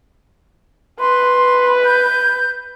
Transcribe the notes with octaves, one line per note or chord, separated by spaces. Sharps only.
B4 C6
G6